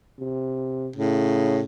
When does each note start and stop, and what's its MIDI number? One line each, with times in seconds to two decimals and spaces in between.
0.19 0.90 48
0.96 1.62 45
0.96 1.62 49